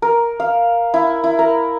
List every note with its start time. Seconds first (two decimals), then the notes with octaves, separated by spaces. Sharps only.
0.02 A#4
0.40 F5
0.94 E4
1.24 E4
1.39 A#4